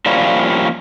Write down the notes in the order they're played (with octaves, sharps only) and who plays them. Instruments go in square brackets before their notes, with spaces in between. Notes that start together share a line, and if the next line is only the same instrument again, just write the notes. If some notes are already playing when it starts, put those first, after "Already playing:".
[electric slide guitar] F3 G3 A#3 C#4 E4